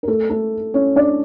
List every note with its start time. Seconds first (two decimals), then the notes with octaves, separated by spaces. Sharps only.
0.03 A#4
0.07 A3 A4
0.30 A3 A4
0.74 C#4 C#5
0.96 D4 D5